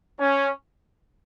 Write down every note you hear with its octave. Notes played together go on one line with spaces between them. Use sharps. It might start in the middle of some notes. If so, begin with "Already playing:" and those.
C#4